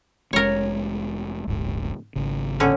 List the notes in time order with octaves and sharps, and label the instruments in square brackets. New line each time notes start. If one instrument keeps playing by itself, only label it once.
[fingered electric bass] F1 G#3 C#4 [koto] A#4 C#5
[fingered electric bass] D1 G1 G#2
G#1 C#3
[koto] A2 D3 C#4